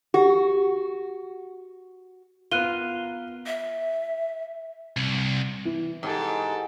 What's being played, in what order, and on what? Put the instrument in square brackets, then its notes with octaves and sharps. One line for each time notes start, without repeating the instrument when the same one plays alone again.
[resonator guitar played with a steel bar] F#4 [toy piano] G4
[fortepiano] B3 A#4 [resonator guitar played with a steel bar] F4 [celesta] F#6 D#7 G7
[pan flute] E5
[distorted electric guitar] C2
[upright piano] E3
[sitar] G#2 [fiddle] G4 A4